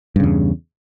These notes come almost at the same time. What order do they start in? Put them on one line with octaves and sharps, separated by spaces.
G2 C#3 E2